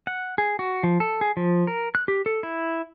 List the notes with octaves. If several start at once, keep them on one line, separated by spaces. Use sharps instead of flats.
F#5
G#4
F#4
F3
A4
G#4
F3
A#4
F#6
G4
A4
E4